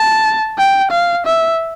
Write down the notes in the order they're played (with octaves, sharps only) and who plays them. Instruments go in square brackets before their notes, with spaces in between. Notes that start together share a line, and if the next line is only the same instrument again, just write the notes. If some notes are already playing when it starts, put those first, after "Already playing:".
Already playing: [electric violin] A5
G5
F5
E5